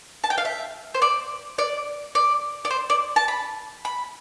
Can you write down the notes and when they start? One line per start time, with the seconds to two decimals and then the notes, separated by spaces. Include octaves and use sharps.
0.24 A5
0.30 G5
0.38 F5
0.45 E5
0.94 C5
1.02 D5
1.58 D5
2.15 D5
2.65 D5
2.71 C5
2.90 D5
3.16 A5
3.28 B5
3.85 B5